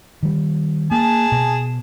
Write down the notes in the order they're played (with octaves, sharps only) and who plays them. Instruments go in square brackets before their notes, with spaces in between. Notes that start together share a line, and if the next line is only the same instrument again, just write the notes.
[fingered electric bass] D#3 G3
[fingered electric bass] A#3 [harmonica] G#4 A5
[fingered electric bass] B2